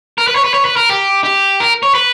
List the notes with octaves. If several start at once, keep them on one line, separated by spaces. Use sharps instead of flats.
A#4
B4
C#5
B4
C#5
B4
A#4
G4
G4
A#4
C#5
B4